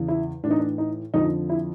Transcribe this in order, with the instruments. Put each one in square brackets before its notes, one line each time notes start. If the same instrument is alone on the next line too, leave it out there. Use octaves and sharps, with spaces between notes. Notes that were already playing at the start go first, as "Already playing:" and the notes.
Already playing: [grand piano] E2 C#3 E3
E4
A2 D4
E3 D#4
D4
D#4
F2 D3 F3 D#4
E4